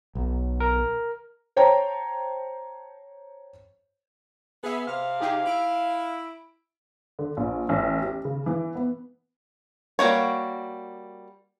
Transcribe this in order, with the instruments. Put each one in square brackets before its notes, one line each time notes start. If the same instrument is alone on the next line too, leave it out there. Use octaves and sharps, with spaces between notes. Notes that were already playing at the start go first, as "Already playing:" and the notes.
[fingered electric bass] B1
[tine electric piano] A#4
[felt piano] C5 C#5 G5 A5 A#5
[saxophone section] B3 [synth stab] G#4 E5
[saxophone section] C3 [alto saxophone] F5 [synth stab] F6
[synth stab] D#4 G4 G#4
[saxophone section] E4 [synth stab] D7
[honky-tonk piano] D3
A#1
A1
G4
C#3
E3
B3
[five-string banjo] G3 A#3 F#4 C#5